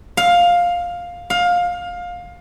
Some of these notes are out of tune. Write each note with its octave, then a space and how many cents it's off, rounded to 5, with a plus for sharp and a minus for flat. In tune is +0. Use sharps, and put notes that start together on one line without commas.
F5 +10
F5 +20